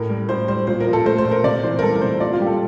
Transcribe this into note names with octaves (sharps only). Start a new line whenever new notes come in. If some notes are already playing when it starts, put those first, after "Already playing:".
Already playing: A2 A#4
G3
A2 C5
G3 C5
A#2 C5
A#4
F3
A4
A3 C5
C5
A#2
A#4
C3 D5
E3 C5
A#4
G3 A4
A#4
C3 C5
A#2 D5
F4
G3 G4
A4